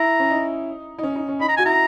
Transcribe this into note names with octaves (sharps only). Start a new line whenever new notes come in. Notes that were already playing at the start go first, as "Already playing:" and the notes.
Already playing: E4 A#5
C#4
D#4
D#4
C#4
D#4
C#4
D#4 B5
A#5
F#4 G#5
E4 A#5